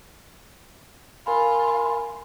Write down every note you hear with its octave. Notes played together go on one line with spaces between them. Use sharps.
F4 A#4 G#5 B5